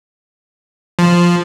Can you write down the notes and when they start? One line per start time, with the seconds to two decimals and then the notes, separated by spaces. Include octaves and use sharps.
0.99 F3